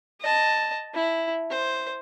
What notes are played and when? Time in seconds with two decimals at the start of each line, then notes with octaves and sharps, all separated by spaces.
0.21 D#5 A5
0.95 E4
1.50 C5